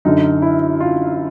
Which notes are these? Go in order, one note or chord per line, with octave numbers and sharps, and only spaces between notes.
F#2 D3 D#4
E4
F4